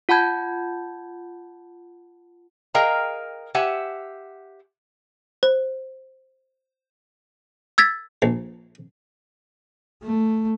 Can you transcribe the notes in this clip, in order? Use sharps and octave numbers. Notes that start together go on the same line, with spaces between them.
F4 F#5 A5 B5 G6 G#6
G#4 A#4 D#5 F5 G5 A#5
G4 C5 E5 F#5 G#5
C5
E6 G#6 A6 B6
A#1
A3